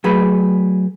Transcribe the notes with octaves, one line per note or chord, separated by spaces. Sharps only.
F#3 A3 G#4 B4